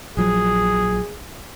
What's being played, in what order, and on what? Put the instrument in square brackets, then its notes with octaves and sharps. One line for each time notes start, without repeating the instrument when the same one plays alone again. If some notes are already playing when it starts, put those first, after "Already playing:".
[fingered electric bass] A#1 F3 F#3 [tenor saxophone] G#4